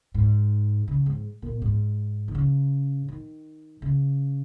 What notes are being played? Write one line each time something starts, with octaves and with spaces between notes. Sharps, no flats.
G#2
C#3
G#2
A#2
G#2
D#3
C#3
D#3
C#3